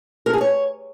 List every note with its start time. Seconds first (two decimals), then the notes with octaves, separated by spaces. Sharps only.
0.26 A#4
0.33 G#4
0.41 C#5